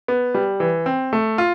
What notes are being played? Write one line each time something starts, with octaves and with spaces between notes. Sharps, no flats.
B3
G3
E3
C4
A3
F4